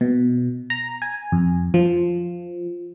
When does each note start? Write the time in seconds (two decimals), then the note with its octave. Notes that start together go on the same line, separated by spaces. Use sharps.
0.01 B2
0.70 A#5
1.02 G#5
1.32 F2
1.74 F3